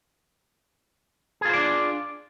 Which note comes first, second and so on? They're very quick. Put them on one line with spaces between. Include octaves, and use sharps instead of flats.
G#4 F4 C5 D5 D4